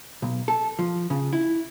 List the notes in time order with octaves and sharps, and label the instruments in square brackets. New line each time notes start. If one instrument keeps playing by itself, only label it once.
[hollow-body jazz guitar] B1
A4
F3
C#3
E4